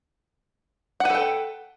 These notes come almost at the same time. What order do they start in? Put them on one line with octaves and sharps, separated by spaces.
F#5 B4 A4 G5